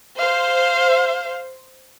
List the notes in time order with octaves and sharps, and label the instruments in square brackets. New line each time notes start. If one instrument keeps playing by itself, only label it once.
[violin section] C5 [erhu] F5